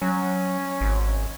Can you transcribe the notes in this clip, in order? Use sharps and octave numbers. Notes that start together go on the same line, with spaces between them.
F#3 C#4
G#1